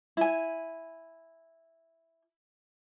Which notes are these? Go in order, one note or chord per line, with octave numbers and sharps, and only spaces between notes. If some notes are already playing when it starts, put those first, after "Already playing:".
E4 G#5